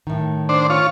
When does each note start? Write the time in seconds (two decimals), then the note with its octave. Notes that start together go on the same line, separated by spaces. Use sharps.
0.07 A2 D#3
0.49 D4 C5
0.70 F4 C#5